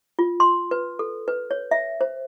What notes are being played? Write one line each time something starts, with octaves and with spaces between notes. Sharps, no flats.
F4
C6
B4
A4
B4
C#5
E5
C5